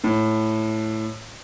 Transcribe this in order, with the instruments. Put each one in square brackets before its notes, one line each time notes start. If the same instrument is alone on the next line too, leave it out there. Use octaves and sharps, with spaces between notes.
[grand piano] A2